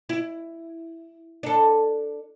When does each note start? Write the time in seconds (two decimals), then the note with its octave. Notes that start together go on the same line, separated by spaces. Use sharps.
0.09 E4
1.43 D4 A4